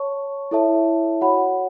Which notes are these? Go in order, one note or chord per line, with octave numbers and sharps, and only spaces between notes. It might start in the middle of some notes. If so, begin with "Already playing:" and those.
Already playing: C#5 A5 C#6
E4 A4 C#5 E5 A5
F#4 C#5 F#5 B5